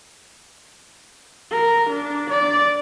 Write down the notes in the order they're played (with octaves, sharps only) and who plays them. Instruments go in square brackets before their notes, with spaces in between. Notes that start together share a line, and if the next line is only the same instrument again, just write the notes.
[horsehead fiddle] A#4
D4
D5